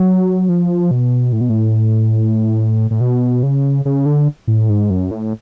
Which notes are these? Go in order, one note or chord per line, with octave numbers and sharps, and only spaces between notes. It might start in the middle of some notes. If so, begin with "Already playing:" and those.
Already playing: F#3
F3
B2
A2
B2
A2
A2
B2
C#3
C#3
D3
A2
G#2
F#2
A2